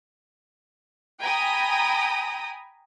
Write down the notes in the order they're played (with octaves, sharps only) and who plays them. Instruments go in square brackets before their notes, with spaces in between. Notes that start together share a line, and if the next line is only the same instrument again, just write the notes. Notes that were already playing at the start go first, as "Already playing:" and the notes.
[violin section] G5 G#5 A#5 B5 D#6